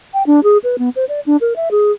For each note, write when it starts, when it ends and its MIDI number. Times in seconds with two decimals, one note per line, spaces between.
0.14 0.23 79
0.27 0.40 62
0.44 0.58 68
0.64 0.76 71
0.78 0.89 59
0.96 1.05 72
1.09 1.20 74
1.26 1.37 62
1.41 1.54 70
1.56 1.69 76
1.71 1.91 68